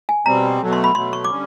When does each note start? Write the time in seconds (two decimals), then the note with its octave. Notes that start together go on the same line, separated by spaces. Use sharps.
0.09 G#5
0.26 B2 G3 C4 A#5
0.61 B2 F#3 A3
0.73 C6
0.84 B5
0.95 B2 F#3 A3 C6
1.13 C#6
1.24 D6
1.30 D3 G3 C#4